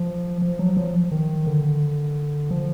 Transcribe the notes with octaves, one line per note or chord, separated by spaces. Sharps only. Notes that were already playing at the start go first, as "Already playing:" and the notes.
Already playing: F3
F3
F#3
F3
D#3
D3
F3